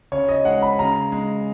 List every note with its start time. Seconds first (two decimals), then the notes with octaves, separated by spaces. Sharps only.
0.12 C#3 C#5
0.29 D#5
0.45 G#3 F#5
0.62 B5
0.79 C#3 A#5
1.12 G#3